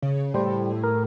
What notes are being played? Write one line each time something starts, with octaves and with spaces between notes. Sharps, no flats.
C#3
A2 G3 C5
A#4